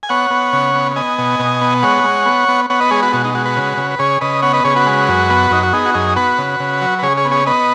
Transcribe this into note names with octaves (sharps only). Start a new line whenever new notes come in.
G#5
B3 C#5 F#5
B3
C#3
B3
B3 D#5 G#5
B2
B2
B3
G#3 C#5 F#5
G#3
B3
B3
B3 C#5 F#5
B4 D#5
G#3 G#4 C#5
F#4 B4
B2 F#4
D#4
G#3 F#4
F#4 B4
C#3
C#3
B4
C#3 G#4 C#5
C#3 B4 D#5
B3 C#5 F#5
B4 D#5
C#3 G#4 C#5
F#4 B4
G#3
F#2
B3
F#2 D#4
F#4
B3 D#4 G#4
F#4
F#2 D#4 G#4
B3 F#4 B4
C#3
C#3
F#3
B4
C#3 G#4 C#5
G#4 C#5
B3
G#4 C#5
B3 B4 D#5